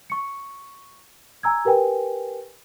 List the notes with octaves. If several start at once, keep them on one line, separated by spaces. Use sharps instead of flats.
C#6 C#7
G#5 A#5 E6 G#6
G4 A#4 B4 G5 G#5